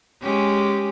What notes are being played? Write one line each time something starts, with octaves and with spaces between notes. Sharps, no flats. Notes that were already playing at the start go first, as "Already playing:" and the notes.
G#3 C#4 G4